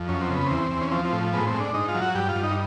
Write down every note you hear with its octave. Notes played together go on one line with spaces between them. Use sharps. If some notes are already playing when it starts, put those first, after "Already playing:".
Already playing: F2
F#2 C#4
C4
C#3
B3
E2 C4
E2
C#4
F3 C4
C4
A2
G#2 B3
C4
G#2
D4
G#2 D#4
F4
F#3
F#4
G2 G4
F4
G2
D#4